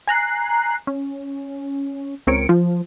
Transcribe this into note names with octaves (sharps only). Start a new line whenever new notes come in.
G#5 A#5 F#6 C7
C#4
C#2 C4 A#4 C#5 C#7 D7
F3